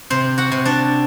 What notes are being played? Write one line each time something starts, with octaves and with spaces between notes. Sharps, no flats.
C3 C4 C5
F#4 F#5
C3
D4 D5